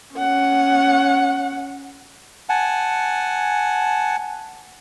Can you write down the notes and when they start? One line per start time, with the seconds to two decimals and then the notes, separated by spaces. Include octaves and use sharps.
0.14 C#4 F#5
2.49 F#5 G#5 A5